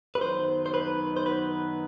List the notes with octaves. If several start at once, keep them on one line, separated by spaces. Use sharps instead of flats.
B4
F#2 D#3 F#3 B3 D#4 C5
C5
B4
C5
B4